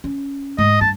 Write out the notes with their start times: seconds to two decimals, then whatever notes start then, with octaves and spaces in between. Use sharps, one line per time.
0.04 C#4
0.58 G#2 D#5
0.81 G2 A5